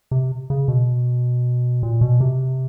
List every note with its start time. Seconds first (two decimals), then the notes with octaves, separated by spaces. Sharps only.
0.11 C3
0.50 C#3
0.68 B2
1.83 A#2
2.01 B2
2.21 C3